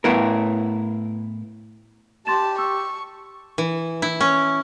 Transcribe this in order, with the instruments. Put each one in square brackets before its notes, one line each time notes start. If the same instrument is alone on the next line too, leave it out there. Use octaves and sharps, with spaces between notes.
[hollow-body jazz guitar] A2 B3 E4 A#4
[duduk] G4 [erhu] A5 [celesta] C6 A6 E7
[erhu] C#6 [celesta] E6
[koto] E3
E4
C#4